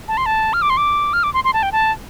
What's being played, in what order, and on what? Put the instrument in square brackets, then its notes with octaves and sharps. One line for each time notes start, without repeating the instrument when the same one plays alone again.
[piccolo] A5
C6
A5
F6
D6
C6
D6
F6
D6
C6
C6
A5
G5
A5